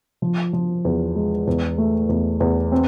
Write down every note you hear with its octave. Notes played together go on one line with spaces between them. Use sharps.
F3
F3
E2
G#3
E2
A3
E2
E2
C4